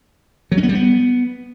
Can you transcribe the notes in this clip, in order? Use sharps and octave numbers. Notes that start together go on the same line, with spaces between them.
F#3
C#4
B3
G3
B3